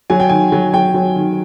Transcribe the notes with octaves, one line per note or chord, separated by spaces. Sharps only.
F#3 G#5
G5
D#3 G#5
F#3
F#3 G5
F#3
D#3